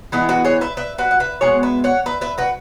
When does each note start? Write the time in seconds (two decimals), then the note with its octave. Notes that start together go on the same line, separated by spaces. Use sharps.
0.12 E3 G#3 B3 E4 G#4
0.29 F#4 B4
0.45 G#4 C#5
0.61 B4 E5
0.77 B4 E5
0.98 F#4 B4
1.11 F#5
1.20 B4 E5
1.41 B2 G#3 B3 G#4 C#5
1.63 B4 E5
1.84 C#5 F#5
2.06 B4 E5
2.21 B4 E5
2.38 F#4 B4